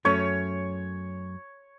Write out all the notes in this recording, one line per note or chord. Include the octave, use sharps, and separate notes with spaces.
F#2 A3 C#4 C#5